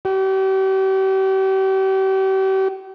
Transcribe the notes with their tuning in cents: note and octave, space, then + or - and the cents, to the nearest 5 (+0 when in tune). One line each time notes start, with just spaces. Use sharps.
G4 -40